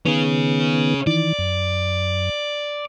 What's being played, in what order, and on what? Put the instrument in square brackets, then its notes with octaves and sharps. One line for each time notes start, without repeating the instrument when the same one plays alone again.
[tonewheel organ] D#3 B3 [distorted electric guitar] C#4 G#4
[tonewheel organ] D#3 E3 [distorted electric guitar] D5
[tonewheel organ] F#2